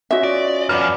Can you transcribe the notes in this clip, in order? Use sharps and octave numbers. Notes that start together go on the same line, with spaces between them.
C#4 F4 F#4 D#5 E5
D5
F#2 F3 B4 D5 F#5 F6